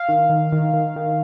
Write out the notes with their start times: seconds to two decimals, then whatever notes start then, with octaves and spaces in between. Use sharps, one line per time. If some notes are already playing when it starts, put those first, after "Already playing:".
Already playing: F5
0.09 D#3
0.30 D#3
0.52 D#3
0.74 D#3
0.96 D#3